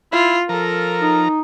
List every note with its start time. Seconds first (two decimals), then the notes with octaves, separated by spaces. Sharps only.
0.12 E4 F4
0.49 F3 A4 A#4 A#5
1.02 D#4